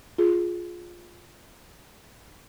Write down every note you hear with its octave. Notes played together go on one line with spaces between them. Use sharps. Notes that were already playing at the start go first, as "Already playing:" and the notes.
F4 G#4